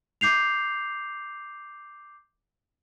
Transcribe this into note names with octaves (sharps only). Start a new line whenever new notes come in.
D6 G6 C7 F7